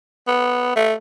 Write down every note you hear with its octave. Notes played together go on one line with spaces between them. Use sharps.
B3
A3